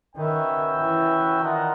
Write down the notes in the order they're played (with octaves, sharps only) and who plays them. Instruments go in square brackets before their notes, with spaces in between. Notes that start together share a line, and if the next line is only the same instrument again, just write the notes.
[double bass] D#3 [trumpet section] C#4 F#4 B4 E5 G5
[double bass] E3
[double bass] D#3 [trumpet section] D4 F4 A#4 D#5 F#5